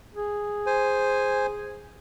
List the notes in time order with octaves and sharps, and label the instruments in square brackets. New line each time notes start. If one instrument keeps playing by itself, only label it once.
[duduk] G#4
[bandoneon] C5 G#5